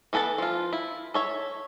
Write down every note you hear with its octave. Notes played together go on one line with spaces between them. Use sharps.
E3 B3 A4 B4 A5
F3 F4
E4
A4 C#5 E5